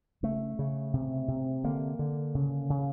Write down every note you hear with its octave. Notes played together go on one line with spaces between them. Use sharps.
C#3 A3
C#3
C3
C3
D3 A#3
D3
C#3
C#3